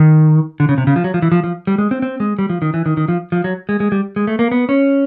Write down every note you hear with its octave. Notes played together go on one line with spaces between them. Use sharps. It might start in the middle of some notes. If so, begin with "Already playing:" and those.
Already playing: D#3
D3
C#3
C3
C#3
F3
F#3
F3
E3
F3
F3
G3
G#3
C4
C4
G#3
G3
F3
D#3
E3
D#3
D#3
F3
F3
F#3
G#3
G#3
G3
G#3
A3
A#3
B3
C#4